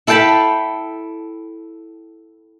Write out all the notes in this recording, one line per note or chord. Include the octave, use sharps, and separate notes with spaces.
E4 A4 F5 G5 A5 B5